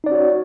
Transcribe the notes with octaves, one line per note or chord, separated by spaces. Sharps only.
C#4 D#4 F#4 C#5 D5